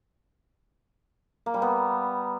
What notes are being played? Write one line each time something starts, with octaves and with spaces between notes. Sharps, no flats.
A#3
G3
B3